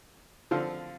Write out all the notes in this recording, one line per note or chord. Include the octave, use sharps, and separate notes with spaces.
D3 F3 C4 F4